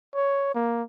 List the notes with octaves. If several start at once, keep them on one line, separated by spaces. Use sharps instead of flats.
C#5
A#3